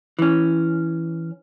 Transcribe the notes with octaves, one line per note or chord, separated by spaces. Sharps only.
E3 C#4